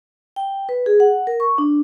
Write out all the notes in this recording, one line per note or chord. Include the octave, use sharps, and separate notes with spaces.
G5
B4
G#4
F#5
A#4
C#6
D4